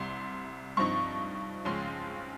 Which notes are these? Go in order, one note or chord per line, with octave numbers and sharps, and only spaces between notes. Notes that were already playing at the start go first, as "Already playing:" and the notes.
Already playing: C2 C3 G3 C6
G2 F3 C4 D#4 C#6
C#2 C#3 F3 G#3 C#4 C6